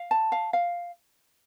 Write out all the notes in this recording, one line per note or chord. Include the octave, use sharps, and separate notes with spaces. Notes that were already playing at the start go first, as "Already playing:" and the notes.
Already playing: F5
A5
F5
F5